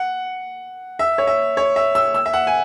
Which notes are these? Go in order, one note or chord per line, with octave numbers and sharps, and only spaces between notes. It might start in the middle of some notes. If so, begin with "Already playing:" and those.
Already playing: F#5
E5
C#5
E5
C#5
E5
E6
E6
E5
F#5
G#5